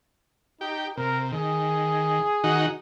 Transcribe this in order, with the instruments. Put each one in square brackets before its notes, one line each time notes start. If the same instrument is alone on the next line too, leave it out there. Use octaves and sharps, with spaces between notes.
[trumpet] D#4 [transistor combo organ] G4
[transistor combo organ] C3 [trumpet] A#4
[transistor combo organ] D#3 [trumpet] G#4
[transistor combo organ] D#3 D#4 F#4